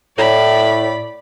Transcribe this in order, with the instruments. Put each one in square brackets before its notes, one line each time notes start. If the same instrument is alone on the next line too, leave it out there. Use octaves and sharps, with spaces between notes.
[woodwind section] A2 [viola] D5 B5